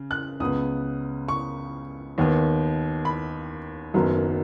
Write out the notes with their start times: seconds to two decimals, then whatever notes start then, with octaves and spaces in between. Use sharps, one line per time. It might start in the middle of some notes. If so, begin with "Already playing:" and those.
Already playing: C#3
0.11 F#6
0.40 C#2 C#3 B3 D#6
1.28 C#6
2.18 D#2 D#3 B3
3.05 B5
3.94 F#1 F#2 D#3 F#3 B3